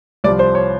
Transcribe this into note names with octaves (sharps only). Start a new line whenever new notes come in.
C2 C3 F3 D5
C5
C#5